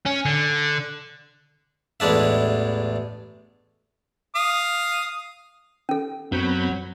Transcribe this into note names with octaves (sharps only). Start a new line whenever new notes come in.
C#4
D3
A1 E2 G#3 D4 E5
F5 D#6
C#4 A4
F#2 F#3 B3 C4 B5 G6